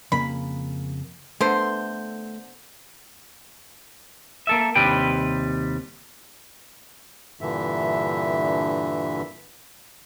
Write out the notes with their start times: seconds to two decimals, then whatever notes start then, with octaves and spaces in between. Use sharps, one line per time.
0.12 F2 C#3 A#3 B5
1.41 D3 A3 B3 C5
4.47 A#3 A4 E5
4.75 D#2 C3 G3 B4 G5
7.41 G2 A#2 D3 E3 E5